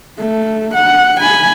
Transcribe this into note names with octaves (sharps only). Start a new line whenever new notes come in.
A3
F#5
G#5 B5